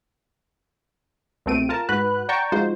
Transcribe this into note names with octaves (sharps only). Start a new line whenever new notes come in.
C2 B2 A3 C4 D7 D#7
F4 A#4 A5
G#2 F#4 B4 F#6
D5 F#5 G5 A5 A#5 C#6
F3 G#3 D#4 F4 F#4 C5